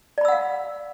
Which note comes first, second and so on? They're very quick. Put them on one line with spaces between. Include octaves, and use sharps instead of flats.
D5 B5 E6 F#5 F5